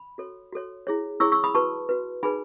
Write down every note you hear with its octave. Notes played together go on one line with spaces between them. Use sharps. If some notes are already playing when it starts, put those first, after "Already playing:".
Already playing: B5
F#4 A4 C#5
F#4 A4 C#5
E4 G#4 C#5
E4 G#4 C#5 C#6 E6
C#6 E6
B5 D#6
F#4 B4 A5 C#6
F#4 B4
D#4 G#4 B4 G#5 B5